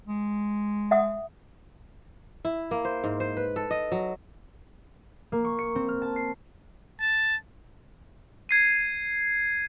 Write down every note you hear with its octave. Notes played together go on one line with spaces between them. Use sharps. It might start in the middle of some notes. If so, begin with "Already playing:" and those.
G#3
E5 F#5 D#6
E4
A#3
C5
G#2
C5
B4
A4
D#5
F#3
A#3
C#6
C#7
C4
F6
A5
C7
A5
G#6 C7 D#7